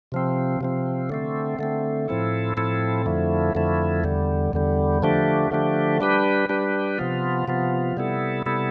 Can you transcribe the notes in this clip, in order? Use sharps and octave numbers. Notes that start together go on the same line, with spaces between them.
C3 F3 C4
C3 F3 C4
D3 A3 C4
D3 A3 C4
A2 F3 C4 E4 A4
A2 F3 C4 E4 A4
F2 D3 F3 A3 E4
F2 D3 F3 A3 E4
E2 D3 G3
E2 D3 G3
D3 F3 A3 D4 G4
D3 F3 A3 D4 G4
G3 D4 G4 B4
G3 D4 G4 B4
C3 F3 B3 F4
C3 F3 B3 F4
C3 G3 B3 E4 A4
C3 G3 B3 E4 A4